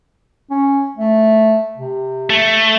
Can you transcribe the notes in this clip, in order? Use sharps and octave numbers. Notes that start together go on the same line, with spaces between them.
C#4
A3
C3
A3